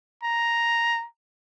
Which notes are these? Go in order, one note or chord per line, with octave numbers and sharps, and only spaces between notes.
A#5